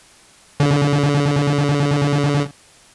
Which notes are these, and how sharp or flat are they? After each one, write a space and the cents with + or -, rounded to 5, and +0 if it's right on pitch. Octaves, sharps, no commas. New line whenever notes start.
D3 -40